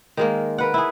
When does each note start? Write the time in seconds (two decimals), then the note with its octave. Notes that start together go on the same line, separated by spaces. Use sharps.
0.17 D#3 G#3 A#3
0.58 A#4 B4 F#5
0.74 E4 G#4